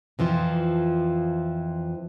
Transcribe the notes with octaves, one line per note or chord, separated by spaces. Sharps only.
F2 E3 F3 F4